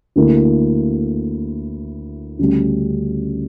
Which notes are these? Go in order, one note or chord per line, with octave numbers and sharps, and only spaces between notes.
D2 D3 A#3 E4
D2 C#3 G3 C#4